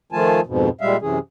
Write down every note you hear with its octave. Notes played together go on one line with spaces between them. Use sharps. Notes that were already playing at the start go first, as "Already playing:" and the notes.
D#3 F3 A3 F4 G#5 A5
F2 G#2 B2
A#2 G3 G#3 E5 F5
F#2 C3 E3 C#4 G#4